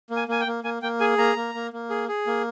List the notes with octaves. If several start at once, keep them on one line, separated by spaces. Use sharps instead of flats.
A#3
G#5
A#3 G#5
G5
A#3
A#3 G#5
A#3 G5
G#4 G#5
A#3 A#5
A#3
A#3
A#3
G#4
G#4
A#3